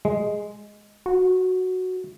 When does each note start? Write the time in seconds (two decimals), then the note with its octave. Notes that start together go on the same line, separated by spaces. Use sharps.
0.05 G#3
1.06 F#4